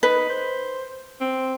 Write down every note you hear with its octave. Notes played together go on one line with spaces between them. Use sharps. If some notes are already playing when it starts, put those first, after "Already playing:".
D#4 B4
C5
C4